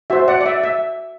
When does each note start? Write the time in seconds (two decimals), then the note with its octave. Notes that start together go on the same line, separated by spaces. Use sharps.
0.10 F#4 C5 E5
0.28 D5 F#5
0.41 D5
0.46 E5
0.64 E5